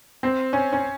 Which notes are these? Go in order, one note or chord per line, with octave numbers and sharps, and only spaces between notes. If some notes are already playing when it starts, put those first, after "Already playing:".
C4
C#4
C#4